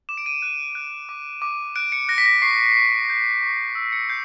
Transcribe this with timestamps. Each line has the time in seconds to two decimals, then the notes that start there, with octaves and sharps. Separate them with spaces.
0.09 D6 E7
0.18 D7
0.26 D#7
0.42 F#6 D#7
0.75 F#6
1.09 D6
1.42 D6
1.76 F#6 D7
1.92 C#7
2.08 F#6 A#6
2.18 B6
2.26 A#6
2.42 C#6 C7
2.76 C#6
3.10 G6
3.42 C#6
3.75 E6
3.92 C#7
4.09 G6 C7